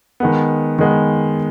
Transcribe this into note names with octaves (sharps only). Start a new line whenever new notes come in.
D#3 G#3 B3
D#3 G#3 B3